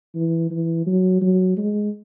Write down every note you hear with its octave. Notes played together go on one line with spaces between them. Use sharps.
E3
E3
F#3
F#3
G#3